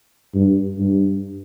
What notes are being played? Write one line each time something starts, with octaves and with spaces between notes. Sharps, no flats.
G2
G2